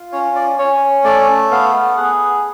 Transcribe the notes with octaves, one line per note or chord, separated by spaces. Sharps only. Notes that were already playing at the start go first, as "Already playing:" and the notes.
Already playing: F4
C#4 C#5
D5
C#4 C#5
A3 D5
B3 F5
G#4 F#5